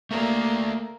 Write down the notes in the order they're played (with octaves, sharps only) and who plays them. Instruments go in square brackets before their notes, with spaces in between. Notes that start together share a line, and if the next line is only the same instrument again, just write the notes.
[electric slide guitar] A3 A4 D5 [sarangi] A#3